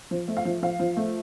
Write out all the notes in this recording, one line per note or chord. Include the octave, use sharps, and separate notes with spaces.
F3
A3
F5
F3
F3 F5
F3
A3